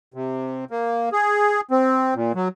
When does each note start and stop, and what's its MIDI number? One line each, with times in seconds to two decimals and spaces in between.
0.14 0.65 48
0.71 1.09 58
1.12 1.61 68
1.71 2.14 60
2.15 2.32 46
2.35 2.48 54